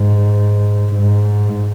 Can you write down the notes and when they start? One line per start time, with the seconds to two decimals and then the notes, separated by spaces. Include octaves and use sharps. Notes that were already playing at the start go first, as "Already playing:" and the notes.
Already playing: G#2
0.93 G#2